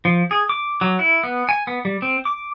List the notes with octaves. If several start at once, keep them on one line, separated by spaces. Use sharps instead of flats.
F3
G#4
D6
F#3
E4
B3
G#5
B3
G3
C4
D6